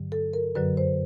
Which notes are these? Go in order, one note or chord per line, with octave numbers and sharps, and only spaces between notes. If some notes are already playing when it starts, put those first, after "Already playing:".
Already playing: G2 D3 F#3
A4
A#4
F#2 D3 F#3 B4
C5